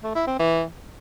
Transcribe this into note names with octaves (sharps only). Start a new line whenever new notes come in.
A3
E4
C4
E3